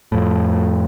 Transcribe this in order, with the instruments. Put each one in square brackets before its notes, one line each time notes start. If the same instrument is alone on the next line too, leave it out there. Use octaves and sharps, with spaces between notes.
[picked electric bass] F2 A2